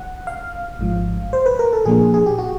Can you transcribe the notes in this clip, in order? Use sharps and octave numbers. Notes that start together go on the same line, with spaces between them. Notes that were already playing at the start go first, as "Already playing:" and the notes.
Already playing: F#5
F5
G#1 G#2 F3
C5
B4
A#4
A4
A#2 F3 A#3 D4 G#4
G#4
G4
F#4